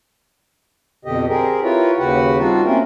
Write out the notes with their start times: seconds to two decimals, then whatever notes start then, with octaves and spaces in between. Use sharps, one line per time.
1.05 F2 B2 D3 G4 D#5
1.29 C4 G4 G#4 A#4
1.63 E4 F4 G4 A#4 B4 C#5
1.98 D#2 C#3 F#4 G4 B4 F#5
2.38 G3 C4 D4 D#4 F4 F#4
2.64 A3 A#3 C4 C#4 A#4